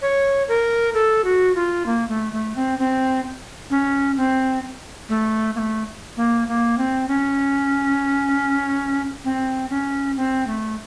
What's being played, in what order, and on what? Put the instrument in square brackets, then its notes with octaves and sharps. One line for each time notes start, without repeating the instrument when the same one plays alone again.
[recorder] C#5
A#4
A4
F#4
F4
A#3
A3
A3
C4
C4
C#4
C4
A3
A#3
A3
A#3
A#3
C4
C#4
C4
C#4
C4
A3